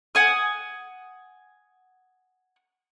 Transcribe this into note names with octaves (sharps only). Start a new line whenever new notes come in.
F#5 G#5 D#6